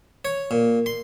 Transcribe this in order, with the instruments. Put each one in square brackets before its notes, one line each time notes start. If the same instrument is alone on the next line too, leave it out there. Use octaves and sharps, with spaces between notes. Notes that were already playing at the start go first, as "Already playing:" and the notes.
[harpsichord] C#5
A#2
C6